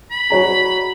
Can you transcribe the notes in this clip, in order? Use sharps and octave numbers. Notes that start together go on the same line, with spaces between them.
B5
F#4 C#5 A#5